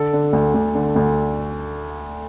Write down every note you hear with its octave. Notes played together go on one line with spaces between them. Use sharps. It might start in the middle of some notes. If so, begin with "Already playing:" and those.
Already playing: D3 A4
D3
D2
D2
D3
D2